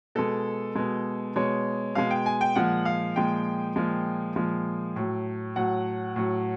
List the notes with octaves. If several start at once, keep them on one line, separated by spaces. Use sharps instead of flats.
B2 G#3 A4
B2 G#3
B2 G#3 C#5
B2 G#3 F5
G5
G#5
G5
A#2 F3 G#3 F#5
F5
A#2 F3 G#3 G5
A#2 F3 G#3
A#2 F3 G#3
A2 F#3
A2 F#3 F#5
A2 F#3